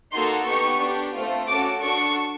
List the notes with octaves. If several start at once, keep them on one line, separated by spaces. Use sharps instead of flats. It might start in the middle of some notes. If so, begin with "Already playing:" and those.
A#3 D#4 F#4 A4 C6
B3 D#4 G4 C#6
D4 G4
A3 C4 F4
C#4 F#4 A4 D6
D4 F#4 A4 C#6